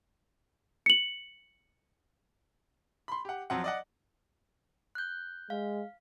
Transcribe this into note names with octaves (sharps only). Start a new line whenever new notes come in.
C#7 F#7
B5 C6
G4 F#5
F2 F#3 C4 F#5
D5 D#5 F#5
F#6 G6
G#3 F5